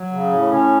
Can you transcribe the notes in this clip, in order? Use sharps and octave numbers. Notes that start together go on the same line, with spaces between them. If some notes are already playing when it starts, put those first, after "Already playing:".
Already playing: F#3
C#3
A2
C#4